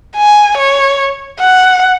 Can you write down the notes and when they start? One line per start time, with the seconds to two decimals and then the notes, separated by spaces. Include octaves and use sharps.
0.17 G#5
0.58 C#5
1.40 F#5